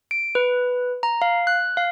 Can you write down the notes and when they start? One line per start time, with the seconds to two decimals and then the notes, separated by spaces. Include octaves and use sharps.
0.11 D7
0.35 B4
1.03 A#5
1.22 F5
1.47 F#6
1.77 F5